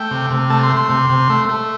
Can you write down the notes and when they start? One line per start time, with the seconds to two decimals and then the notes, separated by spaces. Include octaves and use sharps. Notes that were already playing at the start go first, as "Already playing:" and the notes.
Already playing: A3 G5
0.11 C3
0.30 C3
0.50 A3 A5
0.63 C6
0.69 A3
0.77 C6
0.90 C3
1.10 C3
1.30 A3
1.49 A3